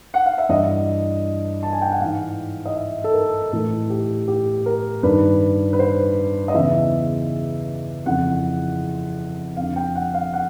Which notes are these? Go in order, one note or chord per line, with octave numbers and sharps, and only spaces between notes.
F#5
F5
E5
G2 E3 D#5
A5
G#5
G5
F#5
G#2 E3 F5
D#5
E5
A4
A#4
A2 E3 A4
G4
G4
A#4
G2 D#3 B4
B4
C5
D#5
E2 C#3 E3 E5
F2 C#3 E3 F#5
F2 D3 F5
G5
F#5
F5
F#5